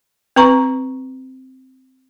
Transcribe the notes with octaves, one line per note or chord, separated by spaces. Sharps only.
C4 B4 A#5 C#6